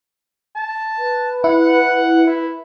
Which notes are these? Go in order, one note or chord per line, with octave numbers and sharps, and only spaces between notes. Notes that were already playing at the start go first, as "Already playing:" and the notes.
A5
B4
E4 F#5
E4